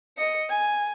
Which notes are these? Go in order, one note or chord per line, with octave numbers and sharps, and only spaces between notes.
D#5 C#7
G#5